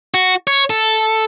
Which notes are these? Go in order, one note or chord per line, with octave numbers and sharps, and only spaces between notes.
F#4
C#5
A4